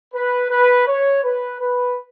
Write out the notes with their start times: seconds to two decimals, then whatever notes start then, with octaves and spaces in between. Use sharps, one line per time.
0.14 B4
0.51 B4
0.87 C#5
1.24 B4
1.60 B4